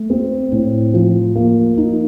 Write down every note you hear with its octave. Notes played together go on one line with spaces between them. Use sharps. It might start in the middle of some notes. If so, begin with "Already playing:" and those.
Already playing: A3
C4
A2
F3
A#3
D#4